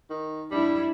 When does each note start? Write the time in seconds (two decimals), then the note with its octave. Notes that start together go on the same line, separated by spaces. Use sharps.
0.10 D#3
0.51 G3 D4 E4